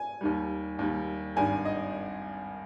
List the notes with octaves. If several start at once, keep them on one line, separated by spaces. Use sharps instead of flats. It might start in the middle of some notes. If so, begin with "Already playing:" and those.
Already playing: G#5
D#2 D#3 G3
D#2 D#3 G3
G#1 G2 D#3 G#5
D#5